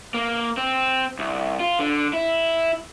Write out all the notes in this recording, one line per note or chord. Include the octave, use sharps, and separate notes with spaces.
A#3
C4
C2
F4
D3
E4